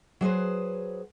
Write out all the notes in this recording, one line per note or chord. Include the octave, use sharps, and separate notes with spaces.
F#3 G#4 B4 C5